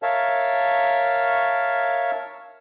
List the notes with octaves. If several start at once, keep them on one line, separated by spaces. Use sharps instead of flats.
A#4 C#5 E5 F5 A5